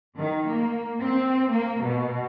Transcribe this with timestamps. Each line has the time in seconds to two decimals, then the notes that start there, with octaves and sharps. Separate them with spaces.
0.16 D#3
0.48 A#3
1.02 C4
1.52 A#3
1.84 B2